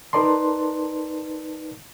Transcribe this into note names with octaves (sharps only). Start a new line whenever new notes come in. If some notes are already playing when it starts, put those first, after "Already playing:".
D#4 A#4 B4 D5 A5 C6